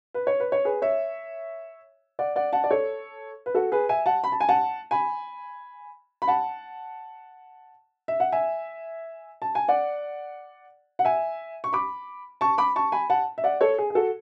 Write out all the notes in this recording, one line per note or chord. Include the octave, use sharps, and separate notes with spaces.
B4
C#5
B4
C#5
G#4 B4
C#5 E5
D5 F#5
D5 F#5
F#5 A5
D5
A4 C#5
B4
F#4 A4
G#4 B4
E5 G#5
F#5 A5
B5
A5
G#5
F#5 A5
G#5 B5
B5
F#5 A5
E5
F#5
E5 G#5
A5
G#5
D5 F#5
F#5
E5 G#5
C#6
B5 D6
A5 C#6
B5 D6
A5 C#6
G#5 B5
F#5 A5
E5
D5 F#5
A4 C#5
G#4
G#4
F#4 A4